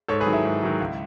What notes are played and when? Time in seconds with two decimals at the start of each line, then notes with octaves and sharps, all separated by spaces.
0.08 G#2 A4 C#5
0.20 G#4 B4
0.26 D#3 F#3
0.33 E4
0.45 G#2
0.63 D#3 F#3
0.80 C#2